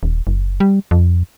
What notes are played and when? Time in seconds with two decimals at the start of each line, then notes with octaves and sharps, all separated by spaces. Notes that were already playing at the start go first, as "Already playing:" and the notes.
0.03 D#1
0.27 F#1
0.60 G3
0.91 F2